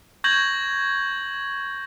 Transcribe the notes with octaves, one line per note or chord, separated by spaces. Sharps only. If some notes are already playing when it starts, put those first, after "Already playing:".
C#6 G6 G#6 A#6 F#7